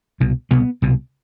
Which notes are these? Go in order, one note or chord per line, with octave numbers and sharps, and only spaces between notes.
C2 B2
C2 B2 B3
C2 B2